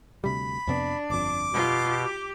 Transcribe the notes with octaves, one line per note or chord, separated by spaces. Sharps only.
D2 C3 G3 B5
F2 C3 B3 D4
G1 F2 D6
B2 F4 G4
G4